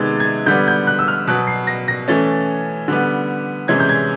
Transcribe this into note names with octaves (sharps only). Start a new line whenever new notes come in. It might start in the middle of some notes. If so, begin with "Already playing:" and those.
Already playing: C3 D#3 G#3 B3 G#6 A6
G#6
D3 G3 B3 G6
G6
F#6
E6
F6
B2 F#3 B3 F#6
C7
A#6
A#6
E3 A3 C#4 A6
D3 G3 B3
C3 E3 G#3 C#4 G#6
G6
G#6